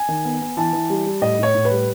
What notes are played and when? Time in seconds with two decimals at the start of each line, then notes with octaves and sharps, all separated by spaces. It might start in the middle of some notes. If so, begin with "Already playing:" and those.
Already playing: G#5
0.08 D#3
0.25 B3
0.41 B3
0.57 E3 A5
0.73 E3
0.90 G3
1.06 G3
1.22 A2 D#5
1.39 A2 C#5
1.54 A2
1.65 B4
1.71 G3